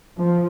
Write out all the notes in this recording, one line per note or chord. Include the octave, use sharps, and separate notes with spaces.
F3